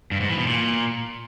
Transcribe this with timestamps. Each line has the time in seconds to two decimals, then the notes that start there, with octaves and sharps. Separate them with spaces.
0.11 G2
0.20 G#2
0.29 E3
0.38 B2
0.47 A#2